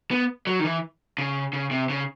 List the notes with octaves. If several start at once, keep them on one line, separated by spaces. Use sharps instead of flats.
B3
F#3
D#3
E3
C#3
C#3
C3
C#3